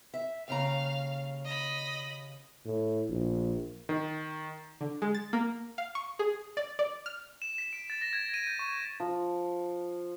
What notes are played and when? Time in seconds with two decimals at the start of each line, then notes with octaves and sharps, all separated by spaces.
0.14 E5
0.48 D#2 C#3 F5 A#5
1.45 D#5 B5
2.66 A2
3.09 A#1
3.89 D#3
4.81 D3
5.02 G#3
5.15 A6
5.33 A#3
5.78 F5
5.95 C#6
6.19 G#4
6.57 D5
6.79 D5
7.06 F6
7.42 E7
7.58 B6
7.73 D7
7.90 A6
8.01 A#6
8.13 G#6
8.34 D#7
8.47 G6
8.59 C#6
9.00 F3